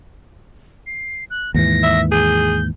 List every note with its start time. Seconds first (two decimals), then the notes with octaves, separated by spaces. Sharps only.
0.87 C7
1.30 F#6
1.54 D#2 G#2 E3 A#6
1.83 E5
2.11 G#4 G6